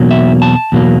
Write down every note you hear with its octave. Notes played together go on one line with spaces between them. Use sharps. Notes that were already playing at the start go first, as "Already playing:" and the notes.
Already playing: E2 B2 F#3 A#3
E5
A5
E2 B2 F#3 A#3